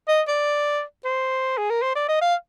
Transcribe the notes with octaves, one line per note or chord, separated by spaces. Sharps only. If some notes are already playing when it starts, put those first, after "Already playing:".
D#5
D5
C5
G#4
A#4
C5
D5
D#5
F5